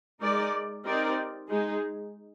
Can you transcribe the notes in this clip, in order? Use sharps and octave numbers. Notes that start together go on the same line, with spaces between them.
G#3 D#4 A#4 D5
C4 D#4 G4 A#4 D5
G#3 D#4 G#4